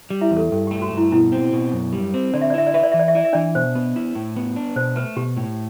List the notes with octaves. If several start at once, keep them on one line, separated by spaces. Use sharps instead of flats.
G3
E4 E5
E2
A4
G2 A4
G4
A3
F#4
G2
E4
B2 E4
C4
B2
F#2
G3
C4
D3 D5
E5
D5
E4 E5
D5
B4 E5
D5
E3 E5
D5
E5
E4 D5
E5
E3 D4 D5
B2 C5
B3
E4
A2
B3
D4
B2 C5
A3 B4
B2 G4
A2